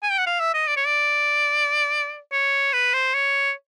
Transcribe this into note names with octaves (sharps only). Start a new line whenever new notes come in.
G#5
G5
F#5
F5
E5
D#5
D5
C#5
D5
C#5
B4
C5
C#5